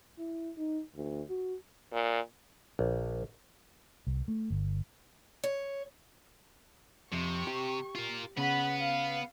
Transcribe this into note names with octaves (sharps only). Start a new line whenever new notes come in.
E4
D#4
D2
F#4
A#2
A#1
C2
A3
G1
C#5
F2 C3 C#6
G4
F4 A#4
C#3 B3 B4 F#5 B5
F5